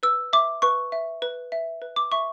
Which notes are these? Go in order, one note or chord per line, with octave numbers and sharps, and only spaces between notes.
B4 E6
E5 D6
B4 C#6
E5
B4
E5
B4
D6
E5 C#6